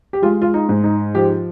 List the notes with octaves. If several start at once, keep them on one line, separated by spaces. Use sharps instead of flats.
G4
G#3 F4
F4
D#4
G#2
D#4
F3 G4